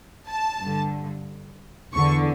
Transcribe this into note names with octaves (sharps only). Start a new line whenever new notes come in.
A5
G2 D3
E2 D3 C#6